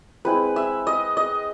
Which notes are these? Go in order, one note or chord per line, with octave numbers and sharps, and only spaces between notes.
G#3 C4 E4 B4
E5
D#5
D#5